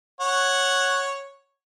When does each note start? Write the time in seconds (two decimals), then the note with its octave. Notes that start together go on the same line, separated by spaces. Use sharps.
0.20 C#5 F#5